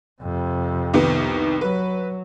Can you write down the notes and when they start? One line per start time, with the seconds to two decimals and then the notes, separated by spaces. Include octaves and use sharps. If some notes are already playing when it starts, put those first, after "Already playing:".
0.22 F2 C3
0.94 C2 D#3 B3
1.61 F#3 B4